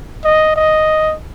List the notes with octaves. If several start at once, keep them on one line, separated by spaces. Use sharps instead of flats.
D#5
D#5